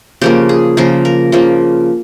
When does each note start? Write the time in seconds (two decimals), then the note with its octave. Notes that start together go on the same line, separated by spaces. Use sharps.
0.22 C#3 F3 A#3 G4
0.49 G#4
0.77 C#3 F3 A#3 A#4
1.05 A#4
1.32 C#3 F3 A#3